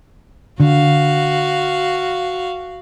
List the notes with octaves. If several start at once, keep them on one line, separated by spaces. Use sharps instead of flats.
D3 F#4 F5